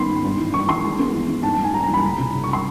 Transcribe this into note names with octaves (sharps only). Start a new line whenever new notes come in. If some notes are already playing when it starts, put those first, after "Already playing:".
Already playing: D#3 B3 B5 C6
G#2
G2
E3
E3 C#6
E3 C6
G#3
B3
E3
E3
G#2 A5
A5
G#2 G#5
G3 A#5
A#5
E3
B5
C#2
C3
C#2
C#6
C6